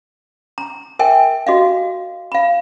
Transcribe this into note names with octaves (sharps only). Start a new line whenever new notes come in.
A#5
A#4 E5 G5 G#5
F#4 D#5 F5
F5 B5